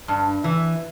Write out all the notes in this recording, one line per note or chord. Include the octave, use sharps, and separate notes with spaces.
G2
E3